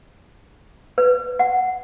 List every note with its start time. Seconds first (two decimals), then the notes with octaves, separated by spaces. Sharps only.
0.98 B4
1.39 F#5